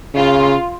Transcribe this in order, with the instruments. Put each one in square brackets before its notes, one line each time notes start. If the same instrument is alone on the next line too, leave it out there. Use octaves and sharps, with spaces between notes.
[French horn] C#3 [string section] F4